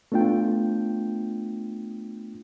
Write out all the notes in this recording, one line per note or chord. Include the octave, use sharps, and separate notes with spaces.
A3 B3 D4 F4 G5